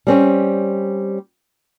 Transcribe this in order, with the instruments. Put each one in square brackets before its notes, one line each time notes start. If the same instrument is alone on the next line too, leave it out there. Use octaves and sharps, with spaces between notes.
[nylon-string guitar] G3 C4 C#4